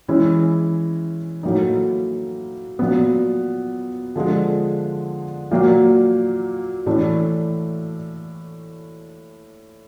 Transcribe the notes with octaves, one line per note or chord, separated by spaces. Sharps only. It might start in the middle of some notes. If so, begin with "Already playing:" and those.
E3 G#3 C#4 E4
A2 F#3 A#3 D#4
A#2 F#3 B3
D3 F3 G#3
A#2 F#3 A#3
A2 E3 A3 D4